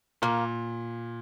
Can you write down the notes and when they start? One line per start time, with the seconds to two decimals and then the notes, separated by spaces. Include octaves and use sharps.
0.22 A#2 A#3